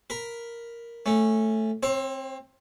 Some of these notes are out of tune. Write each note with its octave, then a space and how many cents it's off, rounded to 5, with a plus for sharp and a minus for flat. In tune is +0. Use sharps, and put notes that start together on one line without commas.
A#4 +0 B5 +0
A3 +0 C#4 -10
C4 +15 C#5 -40